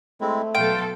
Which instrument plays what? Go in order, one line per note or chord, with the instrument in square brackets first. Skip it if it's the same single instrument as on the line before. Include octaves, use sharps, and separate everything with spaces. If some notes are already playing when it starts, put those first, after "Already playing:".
[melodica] G#3 C4 E4 [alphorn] A3
[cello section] B2 F#3 A4 [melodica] F5 C6 [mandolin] G5